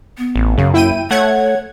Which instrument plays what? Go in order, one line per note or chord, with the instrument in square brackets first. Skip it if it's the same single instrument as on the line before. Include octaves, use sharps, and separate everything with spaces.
[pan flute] B3
[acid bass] A1
[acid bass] F#2 [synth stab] C#3 [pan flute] F5
[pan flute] A#3 [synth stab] E4 G5 D#7
[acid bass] A3 [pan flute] C#5 [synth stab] F#5 G#6